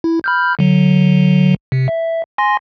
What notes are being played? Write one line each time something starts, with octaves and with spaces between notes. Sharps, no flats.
E4
B5 F6 G6
D3 F#3
C3
E5
G#5 C6 A#6